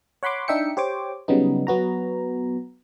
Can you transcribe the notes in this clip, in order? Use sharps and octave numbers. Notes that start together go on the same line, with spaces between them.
C#5 F#5 B5 C6 D6
D4 D#4 E5 G5 C#7
G4 C5 C#5 D6
C#3 F#3 G3 B3 D#4
F#3 B3 F#4 A#5